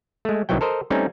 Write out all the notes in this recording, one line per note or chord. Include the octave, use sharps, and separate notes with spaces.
G#3 A3
C2 D#3 E3 F#3 G5
A4 A#4 C5 D#5
G3 A3 C4 C#4 D#4